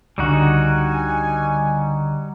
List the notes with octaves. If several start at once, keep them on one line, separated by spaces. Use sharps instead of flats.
C#2 D3 G3 D#4 F#4 G#5